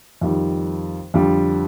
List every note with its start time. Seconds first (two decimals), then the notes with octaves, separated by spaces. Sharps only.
0.21 F2 D#3 G3
1.14 F2 D3 G3